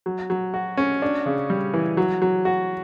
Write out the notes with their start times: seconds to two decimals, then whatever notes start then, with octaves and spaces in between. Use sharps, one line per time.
0.06 F#3
0.30 F#3
0.54 F#4
0.77 C#4
1.02 D4
1.26 C#3
1.50 G3
1.74 E3
1.97 F#3
2.22 F#3
2.45 F#4